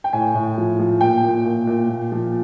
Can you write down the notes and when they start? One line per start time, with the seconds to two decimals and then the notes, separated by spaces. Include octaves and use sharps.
0.04 G5
0.13 A2 G#5
0.35 A2
0.58 F3
0.79 F3
1.01 A#2 G5
1.23 A#2
1.45 A#2
1.67 A#2
1.89 A#2
2.12 F3